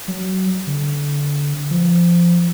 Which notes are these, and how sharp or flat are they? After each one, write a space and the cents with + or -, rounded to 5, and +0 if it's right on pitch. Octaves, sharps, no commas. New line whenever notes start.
F#3 +20
D3 -25
F3 -15